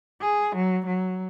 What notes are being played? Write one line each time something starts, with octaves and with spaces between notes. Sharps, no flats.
G#4
F#3
F#3